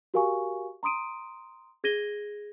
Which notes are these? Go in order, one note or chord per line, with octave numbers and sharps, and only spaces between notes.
F#4 G4 A#4 F5 G#5 C#6
A#5 C6 D#6 D7 D#7
G#4 G#6 A#6 D#7 G7